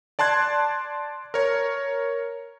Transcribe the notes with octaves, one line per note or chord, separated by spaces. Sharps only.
D5 A5 C6 F#6 G#6
A#4 C#5